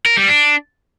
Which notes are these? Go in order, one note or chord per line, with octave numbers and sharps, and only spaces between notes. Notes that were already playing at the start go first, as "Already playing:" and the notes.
A#4
G3
D4